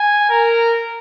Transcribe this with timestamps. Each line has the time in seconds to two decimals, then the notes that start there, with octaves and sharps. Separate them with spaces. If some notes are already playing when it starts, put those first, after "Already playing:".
Already playing: G#5
0.30 A#4